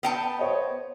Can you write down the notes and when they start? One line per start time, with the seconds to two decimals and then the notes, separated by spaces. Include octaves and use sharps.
0.03 B3 G5 A5
0.39 C5 C#5 D#5